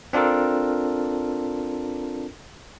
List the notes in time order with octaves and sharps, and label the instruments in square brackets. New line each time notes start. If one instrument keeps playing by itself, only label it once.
[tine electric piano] C4 D4 F4 A4 A#4